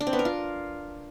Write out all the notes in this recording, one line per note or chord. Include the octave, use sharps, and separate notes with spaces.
D4
C4
B3
A#4
F4